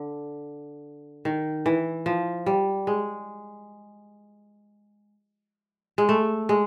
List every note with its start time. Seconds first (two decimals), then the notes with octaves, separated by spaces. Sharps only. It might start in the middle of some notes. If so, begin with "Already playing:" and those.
Already playing: D3
1.25 D#3
1.66 E3
2.06 F3
2.46 G3
2.87 G#3
5.98 G#3
6.09 A3
6.49 G#3